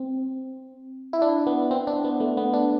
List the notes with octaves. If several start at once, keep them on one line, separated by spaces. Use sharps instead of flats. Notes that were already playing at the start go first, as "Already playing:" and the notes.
Already playing: C4
E4
D4
B3
C4
D4
B3
A3
B3
D4